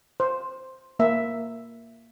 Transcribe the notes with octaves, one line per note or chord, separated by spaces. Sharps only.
C5
A#3 E5